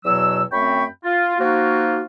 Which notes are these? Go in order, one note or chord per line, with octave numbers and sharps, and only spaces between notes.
E2 B2 F#3 E6
F#2 A3 C4 G5 B5 C#6
F4
F3 A#3 D#4 F4 F#4